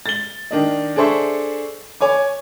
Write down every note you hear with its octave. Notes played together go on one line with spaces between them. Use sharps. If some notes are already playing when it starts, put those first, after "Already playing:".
A6 G7
D#3 D4 D#5
D4 G#4 A4 C5 E5 C#6
C#5 G#5 D6